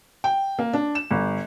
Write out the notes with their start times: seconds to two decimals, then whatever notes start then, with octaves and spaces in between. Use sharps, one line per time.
0.24 G5
0.59 A#3
0.73 D4
0.95 E7
1.11 G1